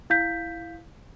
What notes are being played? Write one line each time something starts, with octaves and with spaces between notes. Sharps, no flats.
E4 F5 G6 B6